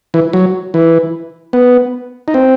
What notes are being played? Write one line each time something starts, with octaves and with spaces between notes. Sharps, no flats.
E3
F#3
E3
B3
D#4
C4